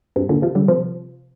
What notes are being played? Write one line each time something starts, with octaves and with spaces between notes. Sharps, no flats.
G2 C3
A#2 D3
C3 F3
D3 G3
C3 F3